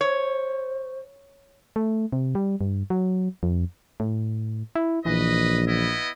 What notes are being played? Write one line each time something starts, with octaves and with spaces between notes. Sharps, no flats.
C5 C#5
A3
C3
G3
G2
F#3
F2
A2
E4
A#1 E3 B4 D#5
B3 E4 D#5